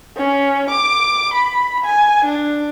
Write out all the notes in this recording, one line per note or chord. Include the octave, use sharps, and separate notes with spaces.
C#4
D6
B5
G#5
D4